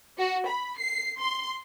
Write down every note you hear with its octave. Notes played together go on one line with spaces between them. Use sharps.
F#4
B5
C7
C6